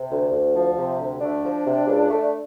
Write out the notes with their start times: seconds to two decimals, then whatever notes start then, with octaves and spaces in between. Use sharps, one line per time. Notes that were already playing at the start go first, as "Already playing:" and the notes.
Already playing: C3
0.11 D2
0.32 D2
0.56 F3
0.78 C3
1.00 D2
1.21 A3 D4
1.44 F3
1.66 C3
1.88 C#2
2.11 A3